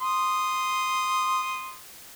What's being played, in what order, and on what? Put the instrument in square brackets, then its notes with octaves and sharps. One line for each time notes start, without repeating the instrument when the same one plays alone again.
[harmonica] C6 D#6